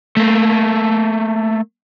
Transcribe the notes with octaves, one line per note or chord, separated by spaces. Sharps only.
A3 A#3